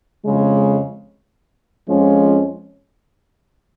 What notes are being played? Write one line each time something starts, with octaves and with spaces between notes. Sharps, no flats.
F2 C#3 G#3
F2 F3 G#3 C#4